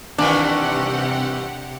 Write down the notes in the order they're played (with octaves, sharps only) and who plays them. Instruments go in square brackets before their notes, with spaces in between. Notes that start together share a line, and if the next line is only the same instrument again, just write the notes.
[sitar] G2 D#3 E3 [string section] C3 G4 F#5 [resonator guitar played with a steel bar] D4